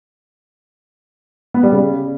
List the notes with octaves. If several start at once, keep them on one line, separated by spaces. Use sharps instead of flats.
B3
G3
C#3